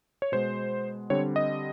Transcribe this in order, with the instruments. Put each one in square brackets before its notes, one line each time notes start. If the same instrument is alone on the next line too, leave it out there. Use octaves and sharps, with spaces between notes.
[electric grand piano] C#5
B2 G#3 B3 C5
D3 G3 C4 C#5
D#5